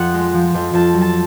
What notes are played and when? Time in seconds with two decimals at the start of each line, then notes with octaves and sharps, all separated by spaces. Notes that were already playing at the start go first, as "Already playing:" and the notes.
Already playing: F2 F3 F#5
0.14 G#3
0.34 F3
0.54 F2
0.74 F2 A5
0.94 F#3
1.01 A5